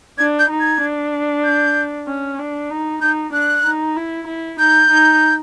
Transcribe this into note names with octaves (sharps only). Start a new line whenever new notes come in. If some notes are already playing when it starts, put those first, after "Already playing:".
D4 G#6
G6
D#4
G#6
D4
G6
C#4
D4
D#4
D#4 G6
D4 F#6
D#4
E4
E4
D#4 G6
D#4